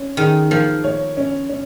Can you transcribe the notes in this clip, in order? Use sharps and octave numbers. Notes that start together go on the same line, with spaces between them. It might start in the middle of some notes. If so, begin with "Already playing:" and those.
Already playing: C#4
D#3 G#4
F3 A#3
C#5
C#4
C#4